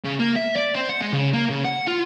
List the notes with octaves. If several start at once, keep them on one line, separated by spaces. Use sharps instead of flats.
C#3
A#3
E5
D5
C4
F#5
G#3
C#3
A#3
C#3
F#5
F4